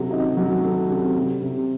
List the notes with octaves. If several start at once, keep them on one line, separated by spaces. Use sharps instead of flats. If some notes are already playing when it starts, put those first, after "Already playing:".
Already playing: C3 F#3 A3
D#4
F#3
A3
C3
G3
C3